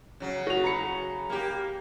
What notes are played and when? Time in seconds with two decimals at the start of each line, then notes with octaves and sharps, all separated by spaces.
0.20 C#3 F#3
0.47 F#4 F7
0.64 A#5 B5 C#7
1.30 A#3 G4